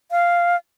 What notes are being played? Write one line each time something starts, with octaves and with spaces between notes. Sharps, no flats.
F5